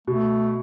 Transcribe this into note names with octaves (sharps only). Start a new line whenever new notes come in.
B2 A3